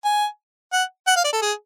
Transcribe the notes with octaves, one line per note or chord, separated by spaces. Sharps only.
G#5
F#5
F#5
F5
D5
A4
G#4